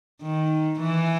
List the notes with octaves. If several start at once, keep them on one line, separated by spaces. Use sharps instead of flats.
D#3
E3